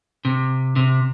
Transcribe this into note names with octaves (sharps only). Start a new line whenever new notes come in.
C3
C3